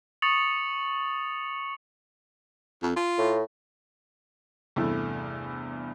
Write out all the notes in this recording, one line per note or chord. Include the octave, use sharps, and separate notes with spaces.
C#6 D#6 A6 C#7 F7 F#7
F2
F4
A2
E2 G2 C3 A3 E4